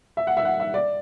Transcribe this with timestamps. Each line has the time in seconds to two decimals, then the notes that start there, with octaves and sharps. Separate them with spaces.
0.17 E5
0.27 F#5
0.37 E5
0.45 F#5
0.60 E5
0.74 D5